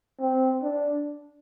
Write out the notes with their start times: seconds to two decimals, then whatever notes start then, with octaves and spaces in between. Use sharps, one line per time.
0.20 C4
0.63 D4